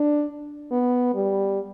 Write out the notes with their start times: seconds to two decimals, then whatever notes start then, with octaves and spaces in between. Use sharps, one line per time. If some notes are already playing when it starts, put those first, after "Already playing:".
Already playing: D4
0.71 B3
1.15 G3